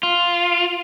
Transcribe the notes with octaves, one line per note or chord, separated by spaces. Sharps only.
F4